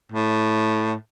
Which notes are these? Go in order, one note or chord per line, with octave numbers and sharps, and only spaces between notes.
A2